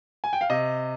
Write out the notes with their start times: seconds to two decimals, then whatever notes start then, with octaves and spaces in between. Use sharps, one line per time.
0.24 G#5
0.33 G5
0.41 F5
0.50 C3 D#5